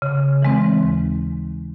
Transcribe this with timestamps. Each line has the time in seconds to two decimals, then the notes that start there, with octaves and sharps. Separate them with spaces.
0.02 C#3
0.42 E3 G#3 C4
0.83 D#2